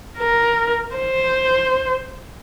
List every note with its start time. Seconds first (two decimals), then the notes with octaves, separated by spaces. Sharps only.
0.18 A#4
0.95 C5